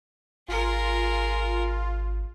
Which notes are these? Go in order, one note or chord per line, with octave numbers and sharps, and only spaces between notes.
G#1 F4 G#4 A#4